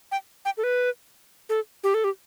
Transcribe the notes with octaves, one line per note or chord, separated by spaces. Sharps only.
G5
G5
A4
B4
A4
G4
A4
G4